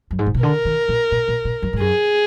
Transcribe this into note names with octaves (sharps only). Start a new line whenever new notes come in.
F#2
G#2
A#2
B2
D3 A#4
D#3
A#2
A#2
A#2
A#2
F#2
G#2
F#2 G#4